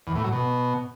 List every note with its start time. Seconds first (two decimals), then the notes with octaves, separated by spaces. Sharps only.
0.07 E2
0.15 A2
0.24 F#3
0.32 B2